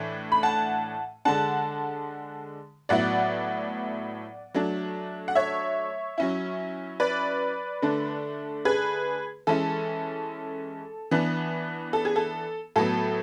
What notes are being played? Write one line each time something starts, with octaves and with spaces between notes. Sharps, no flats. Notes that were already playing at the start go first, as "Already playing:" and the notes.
Already playing: A2 E3 A3 D4
B5
F#5 A5
D3 G#3 D4 F#5 A5
A2 F#3 B3 E4 D5 F#5
F#3 A3 D4
F#5
C#5 E5
F#3 C#4 E4
B4 D5
D3 A3 D4
G#4 B4
E3 G#3 C#4 E4 A4
E3 B3 D4
A4
G#4
A4
A2 F#3 B3 A4